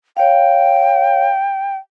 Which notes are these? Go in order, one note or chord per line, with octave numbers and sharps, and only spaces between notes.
C#5 F5 G5